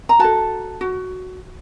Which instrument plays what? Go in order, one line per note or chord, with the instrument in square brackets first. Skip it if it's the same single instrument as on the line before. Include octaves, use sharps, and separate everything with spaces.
[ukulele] A#5
F#4 A4 A5
F#4